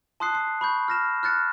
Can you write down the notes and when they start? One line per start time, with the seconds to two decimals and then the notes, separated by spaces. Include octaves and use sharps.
0.20 A5 C6 D#6 F#6 C7
0.35 C7
0.61 B5 C#6 G6
0.88 F6 A#6 E7
1.23 F6 F#6 A6 C#7